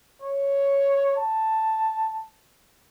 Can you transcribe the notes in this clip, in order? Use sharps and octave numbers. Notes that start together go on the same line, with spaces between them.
C#5
A5